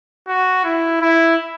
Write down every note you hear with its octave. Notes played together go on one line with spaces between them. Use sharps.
F#4
E4
E4